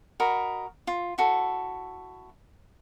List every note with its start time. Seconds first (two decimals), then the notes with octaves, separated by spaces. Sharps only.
0.20 F#4 A#4 D#5 B5
0.87 F4
1.18 E4 F#4 A4